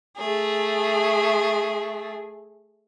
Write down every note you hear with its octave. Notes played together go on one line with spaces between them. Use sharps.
A3 G#4